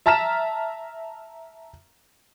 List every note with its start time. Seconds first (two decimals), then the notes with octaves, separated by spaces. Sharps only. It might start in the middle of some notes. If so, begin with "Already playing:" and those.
0.06 E5 A5 A#5 F6 B6 E7